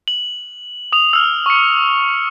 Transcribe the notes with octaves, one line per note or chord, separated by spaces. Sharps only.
F#7
D#6 F7
E6 F6
C#6 C#7